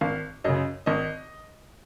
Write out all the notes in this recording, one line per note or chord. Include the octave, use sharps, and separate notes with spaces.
G#1 F5
F#2 C#3 D#5
G#1 D#5